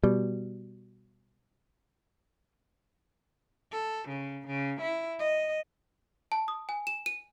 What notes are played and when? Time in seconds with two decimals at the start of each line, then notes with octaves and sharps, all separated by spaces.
0.04 B2 G3
3.72 A4
4.09 C#3
4.47 C#3
4.81 E4
5.20 D#5
6.32 A5
6.48 D#6
6.69 G#5
6.87 E7
7.06 D#7